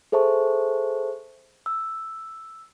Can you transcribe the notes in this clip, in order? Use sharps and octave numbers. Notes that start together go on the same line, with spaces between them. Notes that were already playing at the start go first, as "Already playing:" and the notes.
G#4 A4 C5 E5 A5 C#6
E6